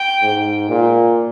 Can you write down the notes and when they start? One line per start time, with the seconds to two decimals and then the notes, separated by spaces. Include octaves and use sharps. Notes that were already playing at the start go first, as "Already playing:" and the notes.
Already playing: G5
0.22 G#2
0.69 A#2